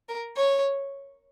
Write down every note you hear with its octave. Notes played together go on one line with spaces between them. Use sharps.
A#4
C#5